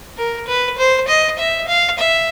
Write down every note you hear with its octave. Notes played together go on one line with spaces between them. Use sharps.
A#4
B4
C5
D#5
E5
F5
E5